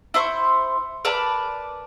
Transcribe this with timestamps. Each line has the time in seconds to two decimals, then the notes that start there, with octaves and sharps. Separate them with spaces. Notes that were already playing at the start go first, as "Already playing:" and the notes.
0.14 E4 C5 C6 C#6
1.05 A#4 B4 D5 A5